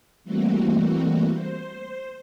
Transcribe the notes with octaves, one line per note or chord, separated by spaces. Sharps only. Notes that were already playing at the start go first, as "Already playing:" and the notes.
E3 G3 A3 A#3 C4 F#4
C5